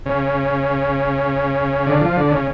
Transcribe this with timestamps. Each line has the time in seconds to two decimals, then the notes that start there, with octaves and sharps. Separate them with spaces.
0.06 C#3
1.86 D3
2.01 F3
2.17 D3
2.32 C#3